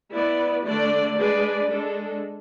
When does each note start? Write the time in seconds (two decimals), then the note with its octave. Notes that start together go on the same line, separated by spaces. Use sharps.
0.13 B3 E4 B4 D5
0.65 D3 A3 D4 A4 D5
1.18 G#3 D4 G#4 B4 D5
1.71 G#3 D4 A4